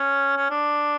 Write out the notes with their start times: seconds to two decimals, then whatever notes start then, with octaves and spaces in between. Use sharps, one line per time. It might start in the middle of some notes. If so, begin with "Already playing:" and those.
Already playing: C#4
0.37 C#4
0.51 D4